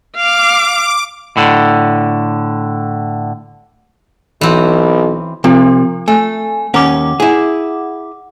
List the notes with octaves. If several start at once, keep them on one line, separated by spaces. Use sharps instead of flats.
F5 D6
A2 D3
B1 E3 C4
C3 F3 C4 F4
A3 G#5
D#2 C#4 A#4 F#5 D6
E4 G#4